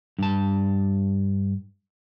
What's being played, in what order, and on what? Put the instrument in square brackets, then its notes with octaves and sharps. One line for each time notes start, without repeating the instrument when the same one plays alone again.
[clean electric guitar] G2 A5